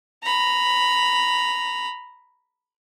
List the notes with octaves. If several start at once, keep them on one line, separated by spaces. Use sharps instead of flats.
A#5 B5